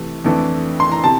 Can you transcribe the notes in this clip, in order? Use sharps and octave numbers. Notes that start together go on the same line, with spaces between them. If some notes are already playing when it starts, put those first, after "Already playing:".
Already playing: C3 E3 A3
F2 E3 A3 D4
C6
A#5
C3 A5